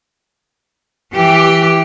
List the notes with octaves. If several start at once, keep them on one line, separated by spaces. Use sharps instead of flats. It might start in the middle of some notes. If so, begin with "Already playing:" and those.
E3 G4